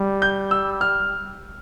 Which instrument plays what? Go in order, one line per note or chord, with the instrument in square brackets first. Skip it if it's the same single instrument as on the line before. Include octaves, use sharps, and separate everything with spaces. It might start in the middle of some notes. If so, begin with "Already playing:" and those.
Already playing: [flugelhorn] G3
[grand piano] G6
E6
F6